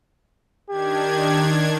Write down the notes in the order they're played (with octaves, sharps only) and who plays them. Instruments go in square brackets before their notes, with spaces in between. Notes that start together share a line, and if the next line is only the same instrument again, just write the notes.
[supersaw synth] D#3 D4 G#6 [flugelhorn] G4